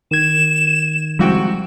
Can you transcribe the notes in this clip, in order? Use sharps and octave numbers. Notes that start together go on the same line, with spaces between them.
D#3 G#6 E7
C3 F3 G3 G#3 F#4 G5